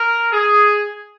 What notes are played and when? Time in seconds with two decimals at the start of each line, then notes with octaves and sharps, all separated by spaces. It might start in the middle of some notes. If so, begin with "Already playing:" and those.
Already playing: A#4
0.33 G#4